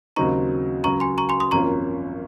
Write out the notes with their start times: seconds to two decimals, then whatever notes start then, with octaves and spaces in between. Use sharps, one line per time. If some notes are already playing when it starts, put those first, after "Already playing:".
0.16 D#2 C#3 F#3 C4 D#4 A#5 C#6
0.84 C#2 C#3 F#3 A#5 C#6
1.00 G#5 C6
1.18 A#5 C#6
1.29 G#5 C6
1.40 C6 D#6
1.51 G#1 F#2 F3 A#3 C#4 A#5 C#6